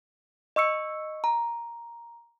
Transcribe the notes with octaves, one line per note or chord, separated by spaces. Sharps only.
D#5 C#6 E6 C#7
A#5